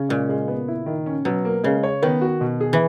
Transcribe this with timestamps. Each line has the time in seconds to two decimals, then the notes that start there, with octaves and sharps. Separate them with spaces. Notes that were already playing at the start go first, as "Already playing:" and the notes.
Already playing: C#3 C#4
0.09 A#2 G#3
0.29 G#3
0.48 B3
0.68 E4
0.86 D#3
1.06 C#4
1.25 B2 F#3
1.45 A#3
1.64 C#3 G#3
1.83 C#5
2.02 D#3 B3
2.22 F#4
2.41 B2
2.61 G#4
2.73 E3